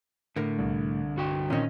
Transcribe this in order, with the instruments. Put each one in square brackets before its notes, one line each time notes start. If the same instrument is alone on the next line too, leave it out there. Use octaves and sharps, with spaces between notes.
[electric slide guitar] A2 [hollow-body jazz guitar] D3 A#4
[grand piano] C2
[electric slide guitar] G2 F#4 G5
[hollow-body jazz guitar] E2 C4 [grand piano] A#2 D#3 D#5 [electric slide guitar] C#4